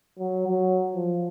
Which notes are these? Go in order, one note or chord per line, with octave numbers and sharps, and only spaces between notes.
F#3
F#3
F3